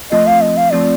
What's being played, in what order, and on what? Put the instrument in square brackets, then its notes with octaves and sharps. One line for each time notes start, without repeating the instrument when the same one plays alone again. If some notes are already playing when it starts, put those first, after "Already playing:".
[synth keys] F3 A3 C4 F4 [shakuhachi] D#5
[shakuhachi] F5
D#5
F5
[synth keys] F3 A3 C4 F4 [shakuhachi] D5